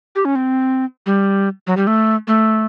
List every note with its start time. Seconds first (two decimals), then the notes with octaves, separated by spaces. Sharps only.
0.16 G4
0.25 C#4
0.35 C4
1.06 G3
1.67 F#3
1.77 G3
1.87 A3
2.27 A3